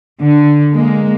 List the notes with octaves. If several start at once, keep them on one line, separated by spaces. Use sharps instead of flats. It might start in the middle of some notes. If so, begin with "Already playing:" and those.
D3
G#3 A#3